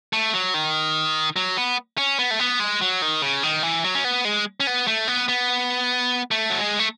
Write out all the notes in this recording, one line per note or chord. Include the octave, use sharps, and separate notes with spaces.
A3
F#3
D#3
F#3
B3
C#4
B3
A3
B3
G#3
F#3
D#3
C#3
D#3
E3
F#3
C#4
B3
G#3
C#4
B3
A3
B3
B3
A3
F#3
G#3
A3